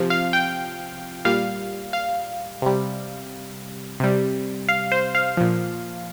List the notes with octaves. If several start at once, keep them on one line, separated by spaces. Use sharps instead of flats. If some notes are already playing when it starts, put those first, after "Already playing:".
Already playing: C3 F3
F5
G5
A#2 G3 F5
F5
C3 G3
C3 G3
F5
C5
F5
A#2 F3